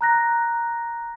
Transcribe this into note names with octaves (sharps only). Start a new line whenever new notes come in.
A#5 F#6 A#6